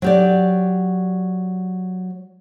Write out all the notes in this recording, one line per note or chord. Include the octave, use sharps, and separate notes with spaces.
F#3 G4 D5